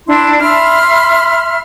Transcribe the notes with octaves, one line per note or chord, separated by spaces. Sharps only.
D4 E4 C6
E5 B5 C6 F6